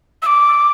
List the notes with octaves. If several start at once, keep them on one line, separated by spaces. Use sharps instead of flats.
E6
D6